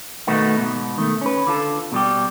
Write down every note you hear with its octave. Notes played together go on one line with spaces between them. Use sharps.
B2 D#3 A3 B3 D#4 F#4
G#2 B2
D#3 A3
C#4 B4
D3 F4 A4
B2 G3 G4